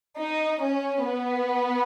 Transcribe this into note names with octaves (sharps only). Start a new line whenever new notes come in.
D#4
C#4
B3